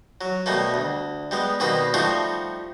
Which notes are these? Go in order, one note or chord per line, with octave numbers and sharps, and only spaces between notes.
F#3
B2 G3 A3 A#3
D2
G3 G#3 B3
B2 D#3 G3 A#3 C4 B4
F3 G3 A3 D#4 F4 F#4